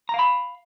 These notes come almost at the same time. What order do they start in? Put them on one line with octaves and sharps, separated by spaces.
A#5 F5 B5